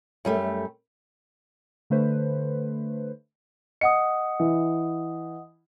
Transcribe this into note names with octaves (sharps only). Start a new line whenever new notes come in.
F#2 G3 A3
D3 A3 B4 C5
D#5 F#5 D#6 C#7
E3